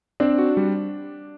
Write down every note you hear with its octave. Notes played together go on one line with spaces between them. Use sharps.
C4 D4
F#4
G3